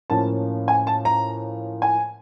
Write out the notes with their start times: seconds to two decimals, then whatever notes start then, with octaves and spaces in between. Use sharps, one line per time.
0.10 A2 F3 A#3 C#4 A5
0.68 G#5
0.87 A5
1.05 A#5
1.82 G#5